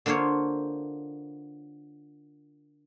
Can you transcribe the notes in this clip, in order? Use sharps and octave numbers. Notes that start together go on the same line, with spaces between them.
D3 A#3 F4 C5 C#5